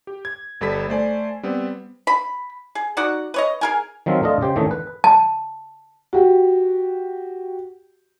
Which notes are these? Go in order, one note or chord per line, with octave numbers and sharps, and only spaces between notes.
G4
G#6
G1 G3 A4 B5 B6
A3 C5 D5 G#5
G3 B3 C4
B5
G#4
D#4 F#4 D5 F#5
B4 C#5 D#5
G#4 A#4 G#5
D#3 F3 F#3 C4 A#4
A3 D4 F4 D#5
C#3 G4 C5 G5
D#3 E3 A3 C#4 D#4
B4
A5
F#4 G4